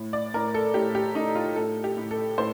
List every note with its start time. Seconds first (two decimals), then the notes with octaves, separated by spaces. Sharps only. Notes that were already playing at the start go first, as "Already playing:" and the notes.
Already playing: A2
0.13 D5
0.34 A2 A#4
0.54 A4
0.74 A2 G4
0.95 G4
1.15 A2 D#4
1.35 F4
1.56 A2 A4
1.84 G4
1.97 A2
2.11 A4
2.38 A2 C5